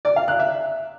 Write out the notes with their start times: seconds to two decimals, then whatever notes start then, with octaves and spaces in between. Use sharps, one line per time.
0.05 D5
0.16 F5
0.28 F#6
0.39 E5